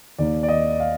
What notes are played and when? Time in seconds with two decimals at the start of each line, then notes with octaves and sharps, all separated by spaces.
0.19 D#2 D#3 A#3 D5
0.43 D5
0.48 D#5
0.80 F5